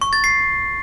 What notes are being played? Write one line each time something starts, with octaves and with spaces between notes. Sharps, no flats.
C#6
A6
C7